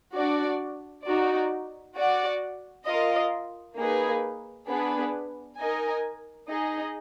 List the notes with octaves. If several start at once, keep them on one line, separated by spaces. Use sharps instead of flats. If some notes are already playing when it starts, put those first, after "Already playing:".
D4 F#4 D5
D#4 F#4 D5
F#4 D5 F#5
F4 A#4 D#5
A#3 D#4 G#4 B4
B3 D4 G#4 B4
D#4 A#4 D#5 G#5
D#4 G#4 D#5